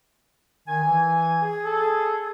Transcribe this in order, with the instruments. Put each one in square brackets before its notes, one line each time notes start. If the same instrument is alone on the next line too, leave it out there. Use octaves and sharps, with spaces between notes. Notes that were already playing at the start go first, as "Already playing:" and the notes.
[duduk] D#3 [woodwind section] G#5
[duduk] E3
[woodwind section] G#4
[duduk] A4